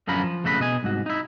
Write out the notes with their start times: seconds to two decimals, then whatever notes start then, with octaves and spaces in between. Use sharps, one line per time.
0.08 F#2 D3 F3 C#4 A#4 B5
0.23 F3
0.44 F2 C#3 A3 F#4 C#5 B5
0.60 B2 D#5 G#5
0.83 C2 G#2 F#4
1.06 D#4 E4